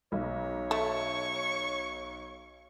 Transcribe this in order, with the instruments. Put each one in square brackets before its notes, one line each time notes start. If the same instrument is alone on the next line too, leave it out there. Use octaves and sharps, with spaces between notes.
[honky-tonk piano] B1 [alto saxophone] C#5
[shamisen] A3 [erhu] C#6